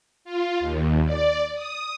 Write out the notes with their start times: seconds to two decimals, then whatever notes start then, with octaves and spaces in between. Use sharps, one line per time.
0.25 F4
0.60 D#2
1.06 D5
1.55 D#6